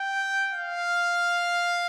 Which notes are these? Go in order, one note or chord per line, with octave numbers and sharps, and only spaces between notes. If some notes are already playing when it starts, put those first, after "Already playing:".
Already playing: G5
F5